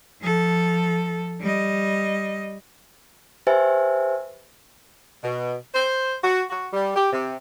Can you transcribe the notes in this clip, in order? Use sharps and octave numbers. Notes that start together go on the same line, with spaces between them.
F3 A4
G3 D#5
G4 B4 C5 E5 G#5
B2
C5
F#4
F#4
G3
G4
C3